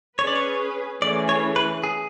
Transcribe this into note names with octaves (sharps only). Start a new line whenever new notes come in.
C#4 G#4 B4 C#5
D5
C#5
E3 A3 C#4 G#4 D5
C#5
B4
G#4